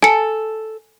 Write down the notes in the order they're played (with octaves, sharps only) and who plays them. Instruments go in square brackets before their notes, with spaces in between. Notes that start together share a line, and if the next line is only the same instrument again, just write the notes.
[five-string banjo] A4 [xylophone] G#5 C#7